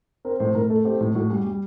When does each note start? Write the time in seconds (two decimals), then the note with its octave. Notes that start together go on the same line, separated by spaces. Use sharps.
0.25 C4 A#4
0.39 A2 C5
0.55 A2 A#4
0.70 A3 A4
0.85 C4 G4
1.01 A2
1.15 A2 F#4
1.30 G3
1.45 G3